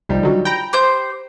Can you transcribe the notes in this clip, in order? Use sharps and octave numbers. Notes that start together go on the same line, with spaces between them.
C2 F3 G3 D#4
D3 F#3
G5 A#5 B5
G4 C5 G6